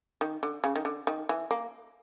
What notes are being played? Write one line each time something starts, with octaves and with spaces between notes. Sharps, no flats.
D#3
D3
C#3
D#3
D3
D#3
E3
A#3